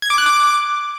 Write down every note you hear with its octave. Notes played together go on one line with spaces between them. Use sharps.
G#6
D6
F#6
D6